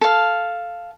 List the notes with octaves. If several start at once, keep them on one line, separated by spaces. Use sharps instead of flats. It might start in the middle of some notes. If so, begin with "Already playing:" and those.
A4 F5